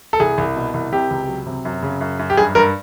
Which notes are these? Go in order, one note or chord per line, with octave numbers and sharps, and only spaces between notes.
A4
C2 G#4
C2
B2
C2
C3 G4
C#2
F#3
C3
F#2
C#3
F#2
F#2
G4
G2 G#4
G2 A#4